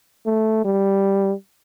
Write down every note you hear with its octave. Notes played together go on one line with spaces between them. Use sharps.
A3
G3